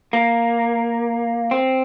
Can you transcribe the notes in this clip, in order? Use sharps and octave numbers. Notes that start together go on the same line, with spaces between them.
A#3
C4